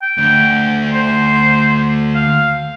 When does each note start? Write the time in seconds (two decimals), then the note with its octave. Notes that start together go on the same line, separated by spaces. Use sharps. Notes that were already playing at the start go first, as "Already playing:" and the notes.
0.02 G5
0.18 D2
0.92 C5
2.15 F5